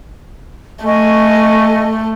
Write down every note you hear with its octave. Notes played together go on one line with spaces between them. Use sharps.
A3 D#5 G#5 C#6